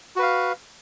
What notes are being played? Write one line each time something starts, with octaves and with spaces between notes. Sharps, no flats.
F#4 B4 F5